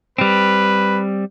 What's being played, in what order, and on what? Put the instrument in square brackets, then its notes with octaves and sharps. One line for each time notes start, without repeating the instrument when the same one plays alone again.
[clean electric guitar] G3 C4 [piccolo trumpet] B4